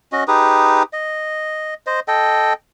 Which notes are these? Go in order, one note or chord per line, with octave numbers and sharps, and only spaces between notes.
C#4 F#4 D#5
D#4 G4 G#4 B4
D#5
C5 D#5
A4 D#5 G5